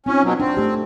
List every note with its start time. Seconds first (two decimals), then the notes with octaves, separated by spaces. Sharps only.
0.06 C4 C#4 D#4 F4
0.23 B2 F#3
0.40 C4 D4
0.57 A3 G4